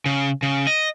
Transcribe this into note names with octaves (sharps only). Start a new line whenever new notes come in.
C#3
C#3
D#5